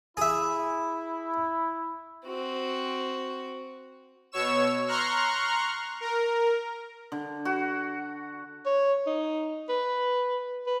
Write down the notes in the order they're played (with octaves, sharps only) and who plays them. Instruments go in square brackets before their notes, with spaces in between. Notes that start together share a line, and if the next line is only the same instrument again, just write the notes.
[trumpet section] E4 [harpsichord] G#4 E5
[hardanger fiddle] C4 F#4
[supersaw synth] B2 C#5 C#6 E6 E7
A#5 C6 C#6 F6 F#6
A#4
[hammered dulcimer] D3
F#4
[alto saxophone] C#5
D#4
B4
B4